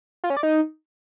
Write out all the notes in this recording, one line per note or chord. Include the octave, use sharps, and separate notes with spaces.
F4
C#4
D5
D#4